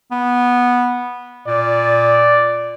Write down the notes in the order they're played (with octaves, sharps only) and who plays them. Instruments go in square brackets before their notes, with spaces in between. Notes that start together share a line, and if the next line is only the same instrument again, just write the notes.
[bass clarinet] B3
[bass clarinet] A#2 [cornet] D5